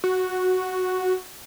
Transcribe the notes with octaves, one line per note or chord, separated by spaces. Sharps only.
F#4